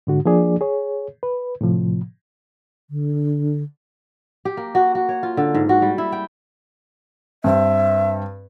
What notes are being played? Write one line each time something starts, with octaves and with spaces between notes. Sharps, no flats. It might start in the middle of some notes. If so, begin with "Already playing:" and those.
G#2 D3 F#4
F3 A#3 D4 G#4 D5
G#4 C#5
B4
A2 C3 F3
D3
G4
A#3
F#4
F#4
C#5
F4
D3
G#2
F#4
G3
E4
G5
G2 C4 E5